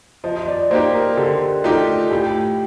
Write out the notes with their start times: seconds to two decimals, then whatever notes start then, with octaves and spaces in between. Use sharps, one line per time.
0.24 F3 D#5
0.36 D#5
0.47 D5
0.70 A#3 D#4 G4 C5
0.94 A#4
1.17 D3 G4
1.64 A3 D#4 F4 G4
2.11 A2 G4